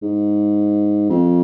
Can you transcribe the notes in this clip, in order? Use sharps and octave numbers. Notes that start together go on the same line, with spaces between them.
G#2
F2